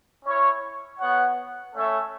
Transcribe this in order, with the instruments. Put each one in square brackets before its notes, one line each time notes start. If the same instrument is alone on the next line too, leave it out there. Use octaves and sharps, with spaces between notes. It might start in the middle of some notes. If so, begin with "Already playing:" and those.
[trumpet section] C#4 E4 C#5
B3 F#4 C#5 F#5
A3 C#4 A4 C#5 E5